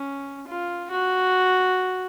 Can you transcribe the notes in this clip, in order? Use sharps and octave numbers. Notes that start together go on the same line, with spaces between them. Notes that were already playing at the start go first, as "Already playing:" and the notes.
Already playing: C#4
F4
F#4